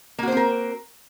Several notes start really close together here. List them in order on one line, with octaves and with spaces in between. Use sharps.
A#3 F#4 C5 C4 A#4